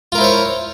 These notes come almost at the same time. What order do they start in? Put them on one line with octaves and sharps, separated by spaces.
F4 A#4 E4 C5 C#5